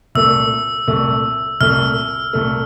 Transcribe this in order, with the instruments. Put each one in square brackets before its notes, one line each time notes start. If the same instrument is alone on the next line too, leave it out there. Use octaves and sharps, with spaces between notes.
[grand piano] C2 A#2 A3 [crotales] E6
[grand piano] C2 A#2 A3
[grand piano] C2 A#2 A3 [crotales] F6
[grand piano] C2 A#2 A3